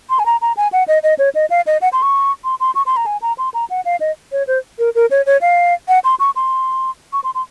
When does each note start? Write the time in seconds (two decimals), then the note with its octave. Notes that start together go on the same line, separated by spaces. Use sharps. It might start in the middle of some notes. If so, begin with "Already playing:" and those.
0.10 C6
0.19 G#5
0.26 A#5
0.41 A#5
0.57 G#5
0.73 F#5
0.88 D#5
1.03 D#5
1.19 C#5
1.35 D#5
1.50 F5
1.67 D#5
1.82 F#5
1.93 C6
2.02 C#6
2.44 C6
2.60 C6
2.75 C#6
2.86 C6
2.97 A#5
3.06 G#5
3.22 A#5
3.38 C6
3.54 A#5
3.70 F#5
3.85 F5
4.00 D#5
4.32 C#5
4.47 C5
4.79 A#4
4.95 A#4
5.11 C#5
5.26 C#5
5.41 F5
5.88 F#5
6.04 C6
6.20 C#6
6.36 C6
7.13 C#6
7.24 C6
7.35 C6